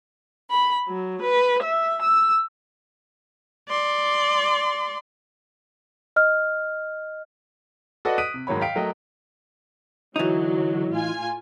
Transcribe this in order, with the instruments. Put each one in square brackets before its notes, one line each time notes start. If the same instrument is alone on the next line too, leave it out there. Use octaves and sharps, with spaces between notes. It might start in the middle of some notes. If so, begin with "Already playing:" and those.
[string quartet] B5
F#3
B4
E5
E6
[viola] D5 C6
[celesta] D#5 F6
[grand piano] F#4 A4 B4 D5 D#5 F#5
D#6 F#6 B6 D7 D#7
C3
G#2 D#3 F#3 C#5 B5
F5 G5 B6 D7
F#3 A3 A#4 D#5 G5
[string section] D3 F#3 [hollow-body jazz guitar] E3 D#4
[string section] A2 F4 G#5